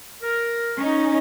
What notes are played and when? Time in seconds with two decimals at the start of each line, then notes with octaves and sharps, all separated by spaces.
0.21 A#4
0.77 C#4 D#4